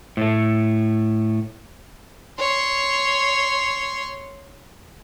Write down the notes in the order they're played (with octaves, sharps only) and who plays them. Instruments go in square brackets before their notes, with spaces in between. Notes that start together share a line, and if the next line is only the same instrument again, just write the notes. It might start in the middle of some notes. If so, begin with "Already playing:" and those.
[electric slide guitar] A2 A3
[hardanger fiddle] C#5 C6